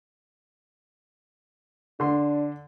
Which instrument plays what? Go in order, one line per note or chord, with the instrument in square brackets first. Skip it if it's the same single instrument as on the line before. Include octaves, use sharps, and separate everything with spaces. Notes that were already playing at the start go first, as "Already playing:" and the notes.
[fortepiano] D3 C6 [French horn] D4